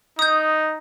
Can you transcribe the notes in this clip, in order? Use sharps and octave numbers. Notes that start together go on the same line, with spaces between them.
D#4 D#6 G6